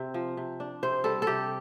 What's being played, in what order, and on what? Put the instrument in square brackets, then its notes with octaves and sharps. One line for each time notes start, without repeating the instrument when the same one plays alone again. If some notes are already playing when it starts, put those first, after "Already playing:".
Already playing: [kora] C3 C4
F3
C3
D4
C3 C5
G3 A4
A4
C3 G4